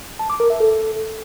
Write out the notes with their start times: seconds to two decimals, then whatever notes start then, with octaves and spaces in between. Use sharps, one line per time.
0.19 A5
0.30 D6
0.40 A#4
0.50 E5
0.60 A4